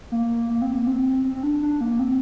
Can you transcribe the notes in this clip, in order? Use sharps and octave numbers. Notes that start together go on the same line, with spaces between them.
A#3
A#3
C4
A#3
C4
C4
C4
D4
D4
A#3
C4